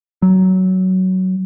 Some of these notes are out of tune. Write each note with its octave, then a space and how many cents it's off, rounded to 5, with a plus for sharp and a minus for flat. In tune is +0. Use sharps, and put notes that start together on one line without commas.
F#3 +10